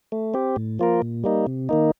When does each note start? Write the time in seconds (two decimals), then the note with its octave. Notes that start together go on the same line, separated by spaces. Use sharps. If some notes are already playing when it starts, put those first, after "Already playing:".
0.12 A3
0.34 C4 G4
0.56 A2
0.79 F3 A#3 F4 A#4
1.02 A#2
1.24 G3 A#3 D#4
1.47 C3
1.69 D#3 A#3 D#4